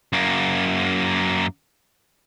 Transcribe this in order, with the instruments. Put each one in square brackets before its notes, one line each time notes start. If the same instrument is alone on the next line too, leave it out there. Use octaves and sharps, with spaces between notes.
[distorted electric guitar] F#2 A#3